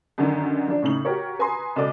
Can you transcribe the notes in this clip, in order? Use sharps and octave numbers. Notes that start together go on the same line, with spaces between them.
F#2 D3 D#3
F3 D4
A2 C#3 D#4 F#7
F#4 G4 A#4 C#5
B4 G#5 A#5 C6 D#6
C#2 B2 A4 D5 D6